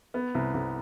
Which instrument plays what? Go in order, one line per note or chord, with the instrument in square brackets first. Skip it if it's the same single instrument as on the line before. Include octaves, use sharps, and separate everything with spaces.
[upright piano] B3
C2
C2